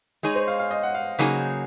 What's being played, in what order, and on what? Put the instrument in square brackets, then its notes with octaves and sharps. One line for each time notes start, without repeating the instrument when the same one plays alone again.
[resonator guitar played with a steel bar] G#3 D#4 G#4 C#5
[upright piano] C5
F5
F5
D#5
F#5
F5
[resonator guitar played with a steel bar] C#3 F#3 A#3 D#4 G#4